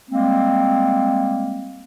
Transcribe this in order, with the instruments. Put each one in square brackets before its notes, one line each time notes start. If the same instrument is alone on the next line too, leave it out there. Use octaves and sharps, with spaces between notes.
[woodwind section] G3 G#3 A#3 C4